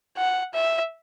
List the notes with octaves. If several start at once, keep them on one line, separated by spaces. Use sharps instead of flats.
F#5
E5